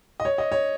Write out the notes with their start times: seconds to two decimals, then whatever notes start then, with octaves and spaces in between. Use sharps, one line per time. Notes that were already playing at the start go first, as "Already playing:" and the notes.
0.20 D#5
0.25 C#5
0.38 D#5
0.52 C#5